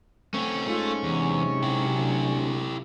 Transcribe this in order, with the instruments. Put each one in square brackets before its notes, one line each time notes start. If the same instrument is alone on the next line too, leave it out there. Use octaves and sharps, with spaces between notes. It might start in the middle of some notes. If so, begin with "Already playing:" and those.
[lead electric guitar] A3 C4 [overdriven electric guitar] C#4
[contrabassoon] G#2 [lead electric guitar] A3 [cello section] F4 A4
[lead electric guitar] E2 [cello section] C3 F#3
[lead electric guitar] E4 G4
[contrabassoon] D2